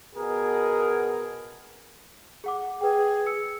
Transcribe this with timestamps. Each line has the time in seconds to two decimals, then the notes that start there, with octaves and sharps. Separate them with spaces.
0.15 B2 G#4 A#4
2.44 G#4 F#5 D6
2.81 G#4 B4 G5
3.26 E6 C#7